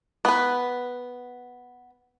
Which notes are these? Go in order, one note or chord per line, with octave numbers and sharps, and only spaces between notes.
B3 B4